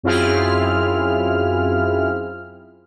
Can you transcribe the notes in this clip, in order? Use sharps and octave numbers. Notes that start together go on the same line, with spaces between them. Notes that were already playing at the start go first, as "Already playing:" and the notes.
F#2 C4 E4 F4 G#4 F6